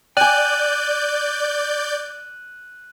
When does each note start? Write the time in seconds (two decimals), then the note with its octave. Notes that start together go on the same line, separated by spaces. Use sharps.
0.17 D5 G5 G#5 F#6 G6 D#7 F#7